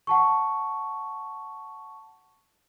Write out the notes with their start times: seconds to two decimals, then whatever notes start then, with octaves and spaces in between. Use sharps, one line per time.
0.07 F#5 A5 C#6